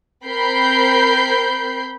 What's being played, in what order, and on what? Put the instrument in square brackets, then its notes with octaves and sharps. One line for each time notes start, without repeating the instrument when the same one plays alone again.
[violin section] C4 A#4 B5 G6 C7